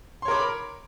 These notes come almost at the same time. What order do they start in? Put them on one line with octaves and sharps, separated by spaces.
C6 C#5 A#4 D6 B5